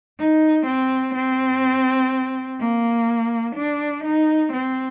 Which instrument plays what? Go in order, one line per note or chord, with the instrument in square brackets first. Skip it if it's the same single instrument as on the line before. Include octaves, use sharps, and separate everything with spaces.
[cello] D#4
C4
C4
A#3
D4
D#4
C4